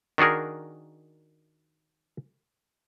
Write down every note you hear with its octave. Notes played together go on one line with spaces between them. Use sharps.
D#3 D4 F#4 G#4 A#4